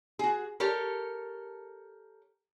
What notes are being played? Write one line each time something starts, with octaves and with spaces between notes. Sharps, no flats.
F#4 G#4
G4 A4 A#4 C#5